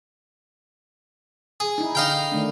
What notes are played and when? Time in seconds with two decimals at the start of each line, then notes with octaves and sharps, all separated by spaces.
1.60 G#4
1.78 D#4 E4
1.95 D3 D#4 F5 G5
2.32 D#3 A3 D4